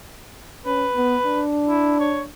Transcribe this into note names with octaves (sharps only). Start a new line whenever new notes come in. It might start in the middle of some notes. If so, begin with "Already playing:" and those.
C#4 B4
B3
D4
E4
C#5